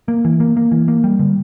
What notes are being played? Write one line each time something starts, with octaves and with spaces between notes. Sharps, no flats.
A#3
E3
A#3
A#3
E3
A#3
G3
D3